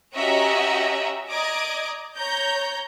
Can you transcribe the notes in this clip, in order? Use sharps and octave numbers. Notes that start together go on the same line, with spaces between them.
C#4 F#4 G4 D#5 E5 A#5
D5 D#5 A#5 D6 D#6 G#6
C#5 A#5 G6